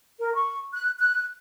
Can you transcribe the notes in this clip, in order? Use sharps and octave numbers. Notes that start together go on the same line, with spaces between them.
A#4
C#6
F#6
F#6